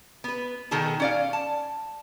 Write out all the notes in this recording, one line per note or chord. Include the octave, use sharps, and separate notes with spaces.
B3 B4
B2 D#3 B3 G#4 A4
C#4 D5 F5
A5